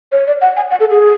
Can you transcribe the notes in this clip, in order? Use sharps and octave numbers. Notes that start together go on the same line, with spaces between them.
C#5
D5
F#5
G#5
F#5
A4
G#4